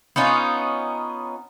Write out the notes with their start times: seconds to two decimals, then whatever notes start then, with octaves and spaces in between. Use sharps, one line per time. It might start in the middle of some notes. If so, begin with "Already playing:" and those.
0.16 B3 C#4 D#4 F4